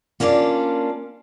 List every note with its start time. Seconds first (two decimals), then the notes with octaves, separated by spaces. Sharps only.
0.20 A#3 C#4 D4 F4 D5